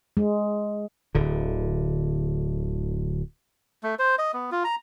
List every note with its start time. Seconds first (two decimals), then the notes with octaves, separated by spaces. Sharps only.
0.17 G#3
1.15 D1 D3
3.83 A3
3.99 C5
4.19 D#5
4.34 B3
4.52 F4
4.64 A#5